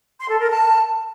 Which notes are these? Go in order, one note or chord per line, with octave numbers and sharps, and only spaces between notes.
C6
A4
A#4
A5